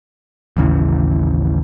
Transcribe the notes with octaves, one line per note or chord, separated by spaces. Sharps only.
A1 D#2 C#3 E3